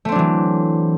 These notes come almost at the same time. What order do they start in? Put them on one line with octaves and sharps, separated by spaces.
A3 C4 D4 F#3 E3